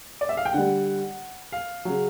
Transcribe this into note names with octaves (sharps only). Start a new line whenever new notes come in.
D5
E5
F5
G5
D3 G3 F#5
F5
C#3 F#3